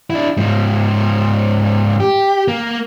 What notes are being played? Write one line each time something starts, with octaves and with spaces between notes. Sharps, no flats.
D4 E4
G#2 F3
G4
A#3